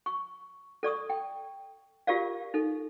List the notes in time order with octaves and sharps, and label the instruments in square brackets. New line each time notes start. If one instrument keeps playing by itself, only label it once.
[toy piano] C#6
A4 D5 C#6 D#6
G5
F4 G4 A#4 D5 F5
D#4 A4